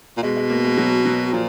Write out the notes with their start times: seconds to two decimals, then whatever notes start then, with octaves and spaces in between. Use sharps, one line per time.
0.17 A#2
0.23 B2 G#3
0.37 G#3
0.50 A#3
0.64 G#3
0.78 F#3
1.05 F#3
1.33 A#2 F3